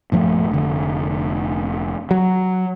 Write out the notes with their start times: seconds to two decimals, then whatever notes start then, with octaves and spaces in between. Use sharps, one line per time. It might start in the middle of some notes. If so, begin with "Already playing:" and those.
0.12 A#1 G2 F3 A3
0.51 F1 D3
2.11 F#3